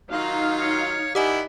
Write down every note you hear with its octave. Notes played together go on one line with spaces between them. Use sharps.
D#3 F#3 D#4 F4 F5
C#5
D#3 E4 G4 D5 D#5 F#5 G#5